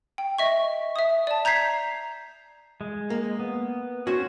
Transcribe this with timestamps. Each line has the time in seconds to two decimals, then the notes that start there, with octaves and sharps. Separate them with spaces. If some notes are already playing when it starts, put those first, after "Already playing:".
0.18 G5
0.38 D#5 E5 C#6
0.96 E5 D#6
1.27 D5 A5
1.45 A#5 G6 G#6 B6 C7
2.81 G#3
3.10 A#3
3.40 B3
4.07 C#4 F#4 C5